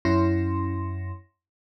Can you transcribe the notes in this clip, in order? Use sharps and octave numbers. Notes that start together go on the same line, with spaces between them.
F#2 C#4 E4 C6 A#6